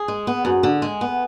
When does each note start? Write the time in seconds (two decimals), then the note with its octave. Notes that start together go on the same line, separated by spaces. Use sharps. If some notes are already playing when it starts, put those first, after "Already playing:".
Already playing: G#4
0.08 G#3
0.27 B3
0.45 F#2
0.63 D3
0.82 G#3
1.01 B3